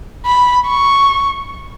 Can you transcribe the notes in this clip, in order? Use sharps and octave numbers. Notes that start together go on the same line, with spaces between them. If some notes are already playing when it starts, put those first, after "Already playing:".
B5
C#6